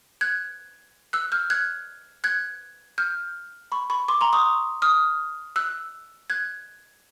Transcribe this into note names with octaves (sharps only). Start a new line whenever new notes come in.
F#6 G#6
E6 F#6
F6 G6
F#6 G#6
F#6 G#6
F6 G6
B5 C#6
B5 C#6
C6 D6
A#5 C6
C#6 D#6
D#6 F6
E6 F#6
F#6 G#6